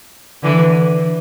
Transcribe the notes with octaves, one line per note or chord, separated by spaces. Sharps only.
D3 E3